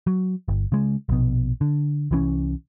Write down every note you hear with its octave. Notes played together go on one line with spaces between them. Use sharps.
F#3
G1
C#3 G#3
A#1 B2
D3
C2 E3 C#4